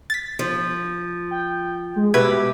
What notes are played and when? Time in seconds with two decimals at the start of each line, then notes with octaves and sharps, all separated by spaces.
0.10 A6 B6
0.39 F3
1.31 G5
1.96 G#3
2.14 B2 G4 B4 E5 G#6